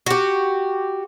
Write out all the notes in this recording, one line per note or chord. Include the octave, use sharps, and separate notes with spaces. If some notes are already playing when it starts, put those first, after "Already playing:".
F#4 G4